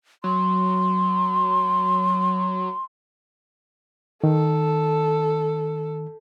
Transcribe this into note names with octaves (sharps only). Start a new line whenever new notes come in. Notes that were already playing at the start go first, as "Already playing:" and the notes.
F#3 C6
D#3 A4